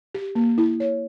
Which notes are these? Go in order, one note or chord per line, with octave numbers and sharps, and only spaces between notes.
G4
A#3
E4
C#5